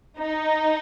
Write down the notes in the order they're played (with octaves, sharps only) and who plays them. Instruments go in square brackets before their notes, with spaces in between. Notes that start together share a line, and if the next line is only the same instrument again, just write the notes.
[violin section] D#4